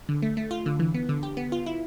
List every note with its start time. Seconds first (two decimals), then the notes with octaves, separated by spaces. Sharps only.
0.09 D3
0.22 A3
0.37 A3
0.51 F4
0.66 D3
0.79 E3
0.94 B3
1.09 D3
1.23 G4
1.37 B3
1.52 F4
1.66 E4